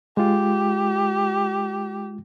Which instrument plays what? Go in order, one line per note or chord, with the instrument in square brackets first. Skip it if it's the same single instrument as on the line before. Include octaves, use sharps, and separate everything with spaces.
[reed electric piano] G#3 F4 [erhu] G4